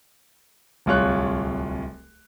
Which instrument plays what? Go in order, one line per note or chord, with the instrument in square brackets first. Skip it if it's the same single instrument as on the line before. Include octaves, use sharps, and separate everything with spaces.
[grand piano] D1 C2 F4 C#5 F#6